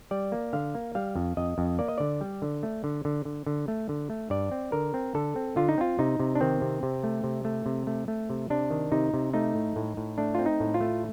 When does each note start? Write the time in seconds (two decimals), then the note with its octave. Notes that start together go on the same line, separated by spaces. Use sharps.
0.11 G3 D5
0.32 A#3
0.53 D3 F5
0.75 A#3
0.95 G3 F5
1.16 F2
1.37 F2 D#5
1.58 F2
1.79 A#3 D5
1.88 D#5
1.98 D3 D5
2.21 G3
2.42 D3
2.63 A3
2.84 D3
3.05 D3
3.25 D3
3.46 D3
3.68 A3
3.89 D3
4.10 A3
4.30 G2 D5
4.51 C4
4.72 D3 A#4
4.94 C4
5.15 D3 A4
5.36 C4
5.56 D3 F4
5.69 D#4
5.78 C4 F4
5.99 C3 D#4
6.20 C3
6.35 D4
6.41 D#3 C4
6.61 C3
6.83 C3
7.04 A3
7.24 C3
7.45 A3
7.66 C3
7.87 A3
8.08 A3
8.30 C3
8.50 C3 D4
8.71 D#3
8.92 C3 D#4
9.14 C3
9.34 A3 D#4
9.55 A2
9.76 A2
9.97 A2
10.18 A3 D4
10.35 C4 F4
10.46 D#4
10.60 A2
10.74 F4
10.81 A3